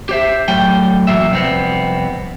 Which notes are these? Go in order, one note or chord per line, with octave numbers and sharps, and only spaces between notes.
G4 C5 E5
A2 F#3 G5
E2 C3 F#3 A#3 E5
C2 F2 B3 C4